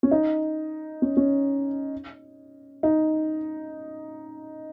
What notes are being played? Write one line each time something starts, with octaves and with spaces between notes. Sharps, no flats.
C#4
D#4
C#4
C#4
D#4